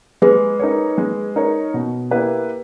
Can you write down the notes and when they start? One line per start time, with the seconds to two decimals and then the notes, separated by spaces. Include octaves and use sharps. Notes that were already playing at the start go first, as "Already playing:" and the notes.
0.22 G#3 G#4 B4
0.59 D#4 A#4 C#5
0.98 G#3
1.36 D#4 A#4 C#5
1.74 B2
2.11 A#3 E4 G4 B4